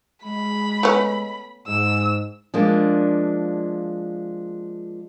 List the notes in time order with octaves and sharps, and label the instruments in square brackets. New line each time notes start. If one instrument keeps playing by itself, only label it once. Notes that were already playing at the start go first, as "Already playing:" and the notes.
[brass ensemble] G#3 [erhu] B5
[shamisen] A3 B3 C#4
[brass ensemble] G#2 [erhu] E6
[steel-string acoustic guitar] F3 G#3 A#3 D4